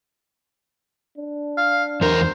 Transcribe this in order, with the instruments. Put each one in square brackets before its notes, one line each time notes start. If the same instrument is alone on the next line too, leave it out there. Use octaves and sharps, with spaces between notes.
[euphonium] D4
[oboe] F5
[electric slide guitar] E2 A#4 [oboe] C5